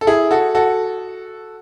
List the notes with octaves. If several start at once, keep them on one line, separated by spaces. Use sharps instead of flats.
A4
E4 G#4
F#4 A4
F#4 A4